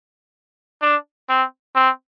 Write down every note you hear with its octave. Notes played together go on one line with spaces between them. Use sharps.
D4
C4
C4